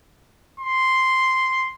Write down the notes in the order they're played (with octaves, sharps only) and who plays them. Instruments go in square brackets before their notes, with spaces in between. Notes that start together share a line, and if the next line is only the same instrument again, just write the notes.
[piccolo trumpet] C6